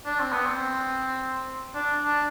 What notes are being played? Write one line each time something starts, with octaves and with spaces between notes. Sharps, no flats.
D4
C4
B3
C4
D4
D4